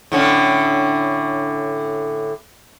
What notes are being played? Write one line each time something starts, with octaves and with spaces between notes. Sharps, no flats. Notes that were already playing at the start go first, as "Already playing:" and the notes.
A2 D3 C#4